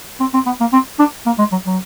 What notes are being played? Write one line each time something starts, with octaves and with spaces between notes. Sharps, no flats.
C4
C4
B3
A#3
C4
D4
A#3
G#3
F#3
F#3